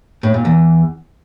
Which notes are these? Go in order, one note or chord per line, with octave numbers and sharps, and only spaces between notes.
A2
A#2
E2